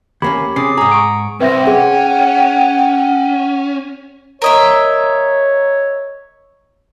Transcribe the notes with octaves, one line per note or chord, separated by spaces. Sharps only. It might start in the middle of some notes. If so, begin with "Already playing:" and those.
D#2 A#3 C#4 G4 B5
C3 C#4 G#4 D6 C7
G#2 G#4 A#5 D#6
C#6 D7
C2 C4 B4 E5 G5 A#6
C#4 G#4 F#5
A#4 C#5 D#5 E5